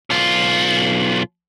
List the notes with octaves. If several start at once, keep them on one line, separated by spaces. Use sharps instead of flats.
B1 F4